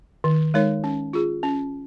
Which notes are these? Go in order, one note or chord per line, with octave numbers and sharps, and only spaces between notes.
D#3
G#3 D#4 A#4 C#5
C#4
F4 G#4
C#4